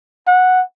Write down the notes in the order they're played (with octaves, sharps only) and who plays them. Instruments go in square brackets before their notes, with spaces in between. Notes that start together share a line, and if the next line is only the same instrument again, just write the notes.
[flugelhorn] F#5